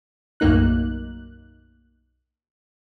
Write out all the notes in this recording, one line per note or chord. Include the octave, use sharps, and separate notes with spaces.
B1 F#2 A2 A#3 D#4 F#6